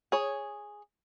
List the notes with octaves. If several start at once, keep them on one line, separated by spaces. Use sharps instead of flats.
G#4 C#5